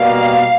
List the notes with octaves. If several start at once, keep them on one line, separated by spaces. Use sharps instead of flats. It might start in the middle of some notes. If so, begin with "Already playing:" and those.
Already playing: B2 G3 A#3 F5